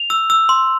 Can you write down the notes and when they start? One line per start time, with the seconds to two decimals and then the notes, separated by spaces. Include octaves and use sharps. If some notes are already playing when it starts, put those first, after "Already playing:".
Already playing: F7
0.10 E6
0.30 E6
0.49 C6